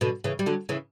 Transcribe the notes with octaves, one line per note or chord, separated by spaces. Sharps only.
B2 D3
C#3 E3
G3
D3 F#3
C#3 E3